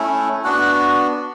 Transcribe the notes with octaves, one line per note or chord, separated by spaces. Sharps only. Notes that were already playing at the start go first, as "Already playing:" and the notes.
Already playing: A3 C#4 E4
B3 D4 F#4 F#5